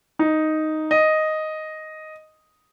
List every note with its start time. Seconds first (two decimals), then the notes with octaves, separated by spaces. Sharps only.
0.19 D#4
0.91 D#5